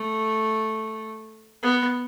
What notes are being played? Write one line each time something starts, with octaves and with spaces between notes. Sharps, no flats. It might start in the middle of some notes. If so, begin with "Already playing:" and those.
Already playing: A3
B3